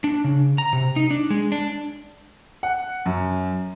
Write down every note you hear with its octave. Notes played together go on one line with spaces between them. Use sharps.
D4
C#3
A#5
C3
D#4
D4
G#3
D4
F#5
F#2